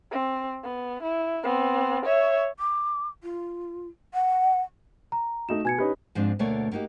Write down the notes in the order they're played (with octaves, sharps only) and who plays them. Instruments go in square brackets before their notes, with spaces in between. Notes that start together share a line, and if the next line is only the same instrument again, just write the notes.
[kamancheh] C4
B3
E4
B3 C4
C#5 E5
[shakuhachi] D6
F4
F#5
[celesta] A#5
[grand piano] A3 D#4 F#4 [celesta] E7
[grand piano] B2 [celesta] G#5 G#6 C#7
[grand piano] C#4 D#4 B4 [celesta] G4
[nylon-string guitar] G#2 F3 C4 D4 F4
D2 B2 A3 A#3 C#5 D5
A#3 B3 D#4 F#4 G4